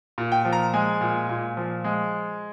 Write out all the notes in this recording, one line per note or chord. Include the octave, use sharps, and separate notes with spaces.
A#2
G5
F3
A#5
G#3 G#5
A#2
A#2
F3
G#3